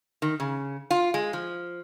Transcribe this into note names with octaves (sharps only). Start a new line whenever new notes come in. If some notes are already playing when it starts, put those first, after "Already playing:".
D#3
C#3
F4
G#3
F3